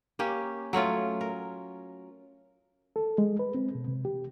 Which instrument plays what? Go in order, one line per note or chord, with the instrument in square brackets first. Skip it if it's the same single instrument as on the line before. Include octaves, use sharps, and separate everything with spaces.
[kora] A#3 C#4 G4
F#3 A3 C#4 F4
A#4
[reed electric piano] A4
G#3
B4
C4
B2
C3
G4